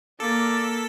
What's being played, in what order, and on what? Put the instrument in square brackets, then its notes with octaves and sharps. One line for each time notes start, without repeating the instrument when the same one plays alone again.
[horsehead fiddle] A#3 [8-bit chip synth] A4 B6 [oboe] D5